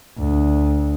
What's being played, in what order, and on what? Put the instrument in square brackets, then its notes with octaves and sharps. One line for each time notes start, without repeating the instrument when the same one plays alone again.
[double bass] D2